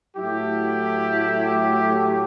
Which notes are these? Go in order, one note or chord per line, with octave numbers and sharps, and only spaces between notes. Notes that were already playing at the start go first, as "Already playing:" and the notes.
A2 F#3 A3 E4 G4